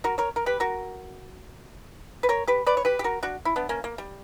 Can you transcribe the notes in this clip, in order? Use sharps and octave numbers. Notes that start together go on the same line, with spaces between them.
F#4 A#4
A#4 C#5
A#4
G4 B4
F#4 A#4
B4
A#4 C#5
G4 B4
B4 D5
C#5
G4 B4
G4
F#4 A#4
D4 F#4
E4
B3 D4
A#3 C#4
A#3
G3